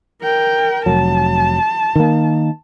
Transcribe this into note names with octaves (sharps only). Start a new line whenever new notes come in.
A#4 G5
F1 F#3 A5
D#3 A#3